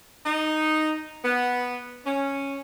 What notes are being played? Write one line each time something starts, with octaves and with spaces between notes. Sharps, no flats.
D#4
B3
C#4